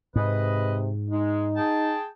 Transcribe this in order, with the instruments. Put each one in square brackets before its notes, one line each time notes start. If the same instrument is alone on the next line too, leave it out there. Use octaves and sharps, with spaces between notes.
[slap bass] G#2 [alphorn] C3 [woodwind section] B4 D#5
[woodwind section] G#3 [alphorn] D#4
[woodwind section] G#4 G5 A5